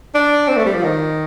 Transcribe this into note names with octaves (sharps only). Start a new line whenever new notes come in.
D4
C4
A3
G3
F3
D#3